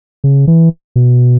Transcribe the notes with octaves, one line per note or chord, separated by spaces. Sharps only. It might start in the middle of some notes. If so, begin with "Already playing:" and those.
C#3
E3
B2